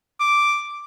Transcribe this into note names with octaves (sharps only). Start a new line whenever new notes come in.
D6